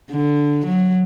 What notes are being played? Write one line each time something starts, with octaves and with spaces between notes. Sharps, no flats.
D3
F#3